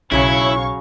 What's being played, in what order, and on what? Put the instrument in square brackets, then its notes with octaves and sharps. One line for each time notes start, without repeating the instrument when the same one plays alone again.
[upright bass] B1 [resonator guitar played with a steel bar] C#3 F#3 C#4 [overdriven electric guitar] E4 [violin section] C#5 F5 C#6